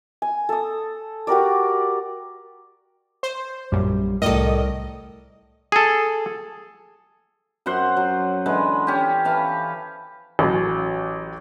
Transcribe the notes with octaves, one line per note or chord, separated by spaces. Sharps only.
G#5
A4 D#6
F#4 G4 A#4 D5
C5
A#1 F#2 G3
C2 A2 A4 A#4 D5 D#5
G#4 A4
F#2 C5 F#5 C6
F#3
D3 E3 G#3
C#4 G4
E3 F5 A5
A1 F#3